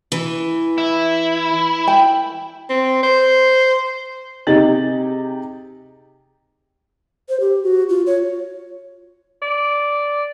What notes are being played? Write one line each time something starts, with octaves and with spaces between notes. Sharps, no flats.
E3
E4
G5
C4
C5
C3 D#4 G4 G#4 A6 F#7
C5
G4
F#4
F4
C#5
D5